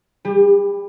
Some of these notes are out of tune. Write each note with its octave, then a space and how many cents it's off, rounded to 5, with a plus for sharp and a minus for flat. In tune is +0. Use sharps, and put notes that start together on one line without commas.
G3 +15 G4 +45